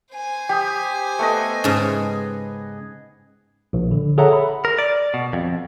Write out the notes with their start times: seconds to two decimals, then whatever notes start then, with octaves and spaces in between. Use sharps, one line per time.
0.13 C5 G#5
0.49 G4 G5 D#6
1.19 A3 B3 D#5
1.64 G#2 C#3 G#4
3.73 A#1
3.91 D3
4.18 G#4 A4 C#5 E5 F#5 A#5
4.33 B5
4.65 A#4
4.78 D5
5.14 B2
5.33 F2